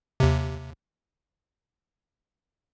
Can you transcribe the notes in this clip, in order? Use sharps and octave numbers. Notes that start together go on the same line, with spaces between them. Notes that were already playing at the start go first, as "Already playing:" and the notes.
D#2 C3